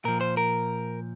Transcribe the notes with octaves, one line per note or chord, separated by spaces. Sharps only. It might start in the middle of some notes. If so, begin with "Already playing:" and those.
A#2 F3 A#4
C5
A#4